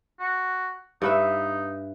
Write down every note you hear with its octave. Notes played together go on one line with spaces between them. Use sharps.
F#4
G2 D#4 B4 E5